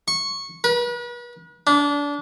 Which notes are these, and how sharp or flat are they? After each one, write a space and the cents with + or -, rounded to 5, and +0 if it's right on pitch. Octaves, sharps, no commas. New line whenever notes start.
C#6 -15
B4 -40
D4 -25